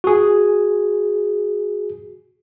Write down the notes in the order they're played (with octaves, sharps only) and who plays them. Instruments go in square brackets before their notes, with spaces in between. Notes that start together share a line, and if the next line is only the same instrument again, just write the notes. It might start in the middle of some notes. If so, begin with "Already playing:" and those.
[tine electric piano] F#4 G#4